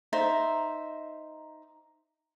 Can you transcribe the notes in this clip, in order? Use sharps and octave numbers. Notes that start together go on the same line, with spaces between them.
D#4 C5 E5